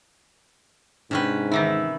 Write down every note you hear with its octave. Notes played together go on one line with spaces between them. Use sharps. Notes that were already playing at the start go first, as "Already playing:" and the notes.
G#2 C3 C#4 D4 B4 G5
D#3 E3 D#4 E4